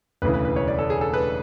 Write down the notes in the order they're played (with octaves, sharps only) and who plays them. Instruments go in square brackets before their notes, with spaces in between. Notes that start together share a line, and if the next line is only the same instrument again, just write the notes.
[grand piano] E1 D2 C#3 E3 B4
B4
B4
C#5
D5
A4
G#4
A4
B4